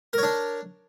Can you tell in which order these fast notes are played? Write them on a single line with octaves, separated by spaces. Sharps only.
A#4 C#5 D4